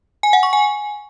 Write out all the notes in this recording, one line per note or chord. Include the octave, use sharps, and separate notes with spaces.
G#5
F#5
C#6
G#5